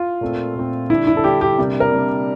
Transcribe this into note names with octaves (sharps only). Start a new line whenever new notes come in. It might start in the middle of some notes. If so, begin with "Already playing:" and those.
Already playing: F4
A#2 A3 C4
A#2 A3 C4
D3 G3 D4 E4
E4
A4
D3 G3 D4 G4
G4
C3 G3 A#3 D4
A#4
C3 G3 A#3 D4